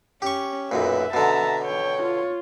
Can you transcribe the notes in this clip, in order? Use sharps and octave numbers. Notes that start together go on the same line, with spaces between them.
C#4 G4 C#6
B1 F#2 A#2 B4 E5
B2 D3 A5 A#5
C#5 G5
F4